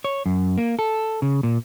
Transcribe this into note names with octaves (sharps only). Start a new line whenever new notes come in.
C#5
F#2
A#3
A4
C#3
A#2